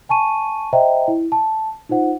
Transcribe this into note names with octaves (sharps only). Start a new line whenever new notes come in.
G#5 A5 C#6 D#7
C5 D#5 E5 G5 A#5
E4
A5
D#4 F4 C5 F#5